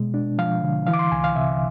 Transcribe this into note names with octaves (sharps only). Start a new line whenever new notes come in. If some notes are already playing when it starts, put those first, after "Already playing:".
Already playing: B2 G#3
D4
F3 F5
D3
E3 F5
D6
C6
C2 G#5
F5
C3 E5